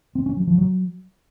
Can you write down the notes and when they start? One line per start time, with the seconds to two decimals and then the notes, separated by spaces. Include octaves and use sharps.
0.15 C4
0.26 C#4
0.37 F#3
0.47 F3
0.58 F#3